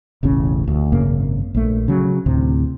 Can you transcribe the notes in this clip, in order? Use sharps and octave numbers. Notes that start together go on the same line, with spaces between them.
E1 A1 C#3 C#4
D2
G#1 F#2 C#3 A#3
A#1 A3
C#3 F#3
D2 A2 C3